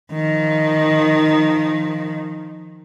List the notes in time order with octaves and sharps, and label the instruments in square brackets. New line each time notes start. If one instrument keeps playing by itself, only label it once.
[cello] D#3 F3